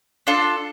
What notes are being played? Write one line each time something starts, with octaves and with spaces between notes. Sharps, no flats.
D4 F4 A4